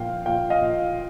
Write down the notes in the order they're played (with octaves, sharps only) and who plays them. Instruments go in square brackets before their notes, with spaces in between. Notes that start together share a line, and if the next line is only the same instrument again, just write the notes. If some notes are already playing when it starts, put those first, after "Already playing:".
Already playing: [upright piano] A#2 F3 F5 G5
A#2 F5 G5
D#5 F5
A#2